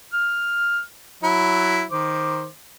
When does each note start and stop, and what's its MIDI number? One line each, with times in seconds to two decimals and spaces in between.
0.13 0.80 89
1.23 1.84 54
1.23 1.84 64
1.91 2.47 51
1.91 2.47 72
1.91 2.47 86